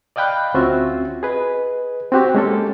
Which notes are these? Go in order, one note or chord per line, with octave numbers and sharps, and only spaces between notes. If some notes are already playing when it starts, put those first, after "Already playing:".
D5 D#5 F5 G5 B5 F#6
D2 C4 C#4 F4 F#4 E5
G#4 B4 D#5
C4 F#4 G4
G#3 A#3 C#4 G4 A4